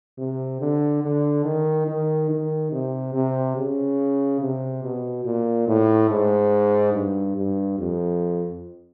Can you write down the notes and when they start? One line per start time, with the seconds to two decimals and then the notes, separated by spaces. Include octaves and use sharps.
0.18 C3
0.61 D3
1.03 D3
1.45 D#3
1.87 D#3
2.29 D#3
2.72 C3
3.14 C3
3.56 C#3
4.41 C3
4.83 B2
5.25 A#2
5.68 A2
6.10 G#2
6.94 G2
7.36 G2
7.79 F2